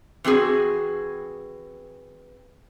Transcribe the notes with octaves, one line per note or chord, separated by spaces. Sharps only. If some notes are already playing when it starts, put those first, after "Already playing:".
E3 C4 F#4 G#4